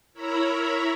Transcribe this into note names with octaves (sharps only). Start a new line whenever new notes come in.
E4 A#4 C#5 E5 A#5 B5